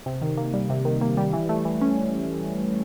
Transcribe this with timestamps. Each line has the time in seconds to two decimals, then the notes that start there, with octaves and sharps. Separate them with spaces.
0.06 C3
0.22 D#3
0.37 A#3
0.54 G3
0.70 C3
0.85 D#3
1.01 A#3
1.17 G3
1.33 E3
1.49 A3
1.65 E3
1.81 C#4